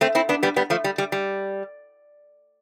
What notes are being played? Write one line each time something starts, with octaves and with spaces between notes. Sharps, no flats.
A3 C4
C4 E4
B3 D4
G3 B3
G3 B3
F3 A3
G3
G3
G3